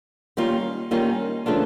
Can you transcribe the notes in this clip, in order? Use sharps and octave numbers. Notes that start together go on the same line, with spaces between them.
D#3 G3 A#3 C#4 F4
D#3 G3 A#3 C#4 F4
C#3 E3 A3 D4 F4